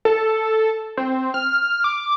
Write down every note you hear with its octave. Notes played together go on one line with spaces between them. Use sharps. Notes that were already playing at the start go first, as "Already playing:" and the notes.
A4
C4
F6
D6